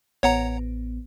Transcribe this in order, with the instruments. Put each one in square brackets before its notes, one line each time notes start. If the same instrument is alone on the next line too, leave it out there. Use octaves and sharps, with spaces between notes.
[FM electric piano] A1 B3 [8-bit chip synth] C#5 F#5 A#5